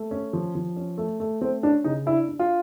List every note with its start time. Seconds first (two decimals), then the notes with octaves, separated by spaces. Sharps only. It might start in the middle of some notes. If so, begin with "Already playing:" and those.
Already playing: A3
0.11 C#4
0.33 F3
0.55 F3
0.76 C#4
0.98 A3
1.20 A3
1.41 A3 C4
1.63 C#4 D4
1.84 C#3 D#4
2.06 D4 E4
2.28 D4
2.39 F4